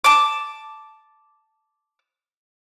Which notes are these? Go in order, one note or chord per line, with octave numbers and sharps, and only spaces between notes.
A5 D6